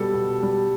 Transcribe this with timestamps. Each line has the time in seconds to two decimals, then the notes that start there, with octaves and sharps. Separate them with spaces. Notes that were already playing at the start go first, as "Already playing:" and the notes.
Already playing: B2 G3 A4
0.14 B2
0.43 G3